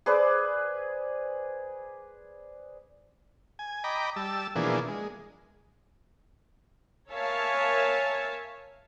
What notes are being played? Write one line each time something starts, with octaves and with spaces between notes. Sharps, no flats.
G#4 B4 C5 D5
G#5
D#5 G5 A#5 B5 D6
G3 A5 E6
B2 E3 F3 A#3 D4 G#4
G#3
A#4 C#5 E5 F5 G#5 A5